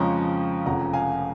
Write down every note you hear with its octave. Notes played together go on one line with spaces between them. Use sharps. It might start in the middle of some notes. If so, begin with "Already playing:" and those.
Already playing: F2 C#3 F3 G#3 A#5 C#6
F1 F2 C#3 F#5 A#5
F5 G#5